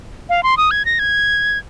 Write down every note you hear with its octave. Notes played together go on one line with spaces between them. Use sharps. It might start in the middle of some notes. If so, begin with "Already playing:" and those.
F5
C6
D#6
G#6
A#6
G#6